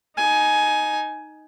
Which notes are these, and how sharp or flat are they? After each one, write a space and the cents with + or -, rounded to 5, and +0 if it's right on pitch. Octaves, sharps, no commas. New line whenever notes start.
D#4 +0 G#5 +15